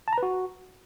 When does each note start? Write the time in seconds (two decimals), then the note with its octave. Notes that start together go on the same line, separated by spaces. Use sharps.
0.08 A5
0.13 A#5
0.18 B4
0.23 F#4